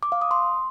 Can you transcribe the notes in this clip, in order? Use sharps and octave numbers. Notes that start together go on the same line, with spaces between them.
D6
F5
D#6
C6